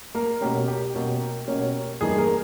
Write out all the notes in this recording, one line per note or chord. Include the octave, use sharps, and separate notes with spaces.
A#3 A#4
B2 A#3 C#4 G4
G4
B2 A#3 C#4
B2 A#3 C#4
G2 E3 A#3 D#4 G#4
A#3 A#4